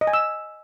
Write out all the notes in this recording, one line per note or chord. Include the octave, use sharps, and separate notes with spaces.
D#5
G#5
E6